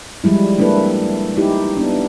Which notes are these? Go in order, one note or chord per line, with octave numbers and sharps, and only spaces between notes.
F3 G3 G#3 E4
A#3 D4 E4 A4 B4
D#4 E4 G4
B3 D4